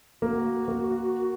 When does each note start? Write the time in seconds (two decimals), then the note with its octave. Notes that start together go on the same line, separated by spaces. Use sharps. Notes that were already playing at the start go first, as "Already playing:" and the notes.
0.22 A#3 F#4
0.68 A#3